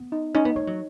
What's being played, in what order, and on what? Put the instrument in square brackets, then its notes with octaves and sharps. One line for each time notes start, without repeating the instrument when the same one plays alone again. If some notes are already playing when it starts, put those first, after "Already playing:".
Already playing: [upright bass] B3
[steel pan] D#4
[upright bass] C#4 [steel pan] D#4
[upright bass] B3
[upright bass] A3 [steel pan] C#5
[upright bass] F#3